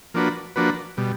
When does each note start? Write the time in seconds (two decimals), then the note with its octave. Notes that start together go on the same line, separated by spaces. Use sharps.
0.14 F3 A#3 D4 F#4 B4
0.56 F3 A#3 D4 F#4 B4
0.97 B2 G3